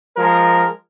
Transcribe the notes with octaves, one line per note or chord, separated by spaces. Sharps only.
F3 G#3 A#4